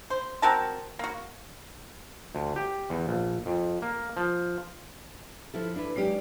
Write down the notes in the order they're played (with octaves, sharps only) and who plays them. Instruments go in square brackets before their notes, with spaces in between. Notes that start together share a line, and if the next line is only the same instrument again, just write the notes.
[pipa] C5
C4 F#4 A#4 A5
A#3 F#4
[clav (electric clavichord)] D2
G4
E2
A#1
F2
A#3
F3
[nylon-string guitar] F3 E4 A4
D4 E4 B4
[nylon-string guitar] F#3 C#4 G4 [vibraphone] G#3 D#4 D5